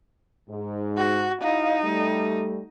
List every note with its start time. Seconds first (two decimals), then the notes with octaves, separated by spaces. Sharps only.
0.50 G#2
0.97 F#4
1.41 D#4 E4 D#5 F5
1.84 G3 A3